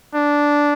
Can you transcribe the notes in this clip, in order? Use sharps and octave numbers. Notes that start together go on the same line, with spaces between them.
D4